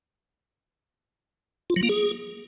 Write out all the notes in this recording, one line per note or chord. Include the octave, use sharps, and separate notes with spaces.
F4
F#3
A#3
G#4